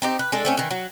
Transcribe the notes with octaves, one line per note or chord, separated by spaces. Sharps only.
C4 D#4 G4
B4
G#3 D4 A4
A3 C4 C#4
D#3 E3
F#3